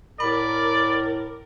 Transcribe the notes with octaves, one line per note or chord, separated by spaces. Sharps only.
A2 A#4 D5 B5